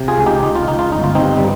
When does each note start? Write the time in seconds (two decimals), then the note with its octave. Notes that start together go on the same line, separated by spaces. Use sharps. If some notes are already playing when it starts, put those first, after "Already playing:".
Already playing: C3
0.08 F4 G#4
0.18 C#2
0.26 D#4 G4
0.43 C#2 D#4
0.55 F4
0.68 C#2 D#4
0.79 F4
0.92 G1 D#4
1.04 F4
1.15 C4 D#4
1.22 G2
1.37 G3